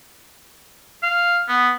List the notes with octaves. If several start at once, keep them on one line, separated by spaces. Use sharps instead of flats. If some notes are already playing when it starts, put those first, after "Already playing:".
F5
B3